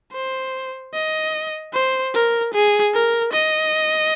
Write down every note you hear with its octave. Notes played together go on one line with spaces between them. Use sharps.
C5
D#5
C5
A#4
G#4
A#4
D#5